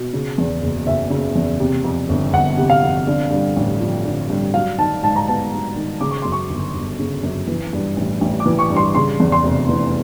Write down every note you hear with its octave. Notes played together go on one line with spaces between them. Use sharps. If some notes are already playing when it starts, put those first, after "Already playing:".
Already playing: B2
C#3
E2
F#1
F#1 E5
C#3
E2
C3
F2
G1
G1 F#5
C3
F5
F2
D3
G2
A1
F3
D3
G2
F#3 F5
D#3 A5
G#2 A5
A#5
B3 A5
F#3
D#3
C#3 D6
C#6
F#2 C6
C#6
G1
G1
C#3
F#2
E3
G2
A1
A1
D6
E3
C#6
G2
C6
C#3 C6
E2
C6
F1
E3